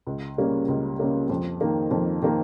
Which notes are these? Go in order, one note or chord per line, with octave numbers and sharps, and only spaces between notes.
C#2
C#3 G3 A#3 C#4
C#2
C#3 G3 A#3 C#4
F2
D#3 A#3
F2
D#3 A#3